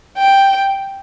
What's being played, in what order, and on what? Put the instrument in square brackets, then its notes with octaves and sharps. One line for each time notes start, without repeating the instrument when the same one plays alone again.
[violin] G5